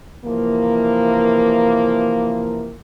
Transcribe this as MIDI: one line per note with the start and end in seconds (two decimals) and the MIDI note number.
0.25 2.75 48
0.25 2.75 52
0.25 2.75 53
0.25 2.75 58